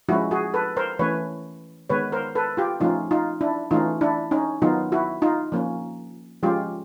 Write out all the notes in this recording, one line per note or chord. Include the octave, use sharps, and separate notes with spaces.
F3 G#3 C#4 E4 F#4
F#4 G#4
A4 B4
A#4 C5
E3 A3 C#4 B4 C#5
D#3 G#3 B3 B4 C#5
A#4 C5
A4 B4
F4 G4
F3 A3 C#4 D#4 F4
D#4 F4
D4 E4
E3 A3 C#4 D#4 F4
D4 E4
C#4 D#4
D#3 F#3 B3 D#4 F4
E4 F#4
D#4 F4
F3 A#3 C#4
F3 G#3 C#4 F4 G4